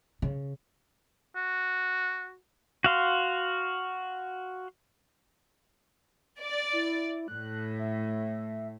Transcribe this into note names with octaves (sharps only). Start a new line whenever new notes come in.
C#3
F#4
F#4 F5 C6
D5
E4
A2 F#6
E5